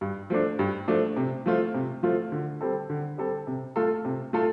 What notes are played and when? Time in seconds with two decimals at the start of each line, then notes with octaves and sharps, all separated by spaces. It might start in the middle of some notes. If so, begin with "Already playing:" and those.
0.01 G2
0.30 F3 A3 D4
0.59 G2
0.88 F3 A3 D4
1.16 C3
1.46 F3 A3 F4
1.74 C3
2.03 F3 A3 F4
2.32 D3
2.61 G3 C4 A4
2.90 D3
3.18 G3 C4 A4
3.47 C3
3.76 A3 F4 A4
4.05 C3
4.33 A3 F4 A4